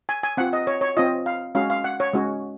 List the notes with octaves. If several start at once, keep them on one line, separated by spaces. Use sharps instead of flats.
G#5
G#5
C4 F4 F#5
D#5
C#5
C#5
C4 F4 D#5
F5
G#3 C#4 F#4 F5
F5
F#5
C#5
G#3 C#4 F#4